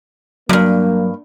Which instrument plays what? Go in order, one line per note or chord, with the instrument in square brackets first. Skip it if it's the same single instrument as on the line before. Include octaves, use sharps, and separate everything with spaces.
[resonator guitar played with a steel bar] E2 G2 [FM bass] F#3 [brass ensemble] A#3